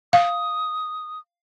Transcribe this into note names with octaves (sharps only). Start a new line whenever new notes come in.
F5 D#6